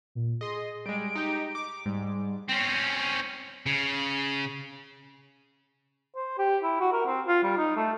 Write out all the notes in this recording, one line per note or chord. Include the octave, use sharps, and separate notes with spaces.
A#2
G#4 D#5 C6
G3 G#3 D7
D#4 G4
D6
G#2 G3
C4 C#4
C#3
C5
G4
E4
F#4
A#4
C4
F4
G3
D#4
A3